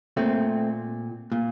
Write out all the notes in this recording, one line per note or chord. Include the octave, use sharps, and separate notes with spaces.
A#2 A3 C4
A#2